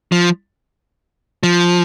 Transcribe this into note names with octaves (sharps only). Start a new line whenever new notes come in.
F3
F3